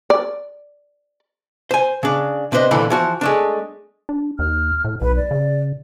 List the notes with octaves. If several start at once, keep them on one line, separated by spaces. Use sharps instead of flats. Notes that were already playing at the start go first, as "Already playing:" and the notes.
D5
C5 G#5
C#3 D4
C3 D4 B4 C5 D#5
A#2 D3 E3 A4 B5
E3 F3 F#4
G#3 A3 D4
D4
D#2 F6
A2
B1 B4
D5
C#3